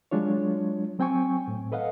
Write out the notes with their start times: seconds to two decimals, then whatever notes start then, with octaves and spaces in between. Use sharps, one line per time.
0.11 F#3 G#3 D4 F4 C#5
0.99 F#3 C4 G5 G#5 C#6
1.47 A2
1.72 A4 B4 D#5 F5 F#5